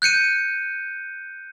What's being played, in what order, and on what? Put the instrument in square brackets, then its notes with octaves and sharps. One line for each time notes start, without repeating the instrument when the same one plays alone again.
[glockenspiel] F#6 G6 C#7 D#7